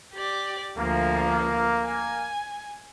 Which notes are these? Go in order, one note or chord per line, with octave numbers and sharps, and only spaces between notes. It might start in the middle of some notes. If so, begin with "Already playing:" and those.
G4 D5
D2 F3 A#3
G#5